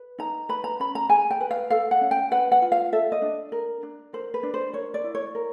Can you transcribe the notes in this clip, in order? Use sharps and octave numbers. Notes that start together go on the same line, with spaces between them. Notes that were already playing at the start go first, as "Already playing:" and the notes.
Already playing: B4
D#4 A#5
B4 B5
A#5
C#4 B5
A#5
G#4 G#5
G5
B4
F5
A4 F5
F#5
C#4
G5
B4 F#5
F#5
F4
F5
A4 E5
D#5
D4
A#4
D4
A#4 C5
B4
D4
C5
A#4 C#5
D5
E4
C#5
A#4